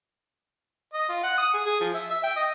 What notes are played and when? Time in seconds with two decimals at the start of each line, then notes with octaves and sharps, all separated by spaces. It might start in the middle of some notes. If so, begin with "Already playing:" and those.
0.94 D#5
1.09 F4
1.23 F#5
1.38 D#6
1.54 G#4
1.66 G#4
1.81 F3
1.94 E5
2.10 E5
2.24 G5
2.36 D#5